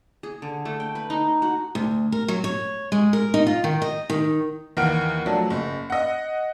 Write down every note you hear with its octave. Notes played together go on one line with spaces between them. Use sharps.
G#4
D3
A3
G5
B4
D#4
F#4
D2
A#4
F#3
C#5
G#3
A#4
D#4
F4
D#3
D#5
D#3
D#2 E3 A#3 F#5 F6 D7
F3 F#3 A3 D4
F#1
D#5 F#5